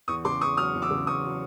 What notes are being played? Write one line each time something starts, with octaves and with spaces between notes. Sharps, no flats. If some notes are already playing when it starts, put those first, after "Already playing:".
E2 C#6 D#6
C#3 C6 D6
E2 C#6 D#6
F#3 D#6 F6
E2
D6 E6
C#3
E2 C#6 D#6
F#3